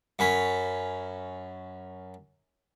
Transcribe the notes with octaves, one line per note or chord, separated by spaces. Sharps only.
F#2 C#4 B5